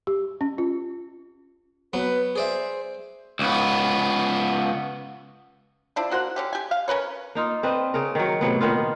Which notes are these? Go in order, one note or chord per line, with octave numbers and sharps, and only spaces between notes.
G4
C#4
F4
F#3 B3 B4
G#4 C5 D5 E5
C#2 B3
F3 D4 E4
A#3 F#4 C5 F#5
D3 C#4 G4
G4 G#5
F5
C#4 A#4 B4 C#5
A#3 D#4 F4
C4 D4 B4 D#5
C#3 A#4
D#3 F#3
A2 C3 F#3 B3
A#2 D#3 B3 F4